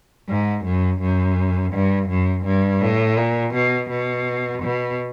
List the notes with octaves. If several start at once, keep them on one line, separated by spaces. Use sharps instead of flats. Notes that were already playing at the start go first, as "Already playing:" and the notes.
G#2
F#2
F#2
G2
F#2
G2
A2
A#2
B2
B2
B2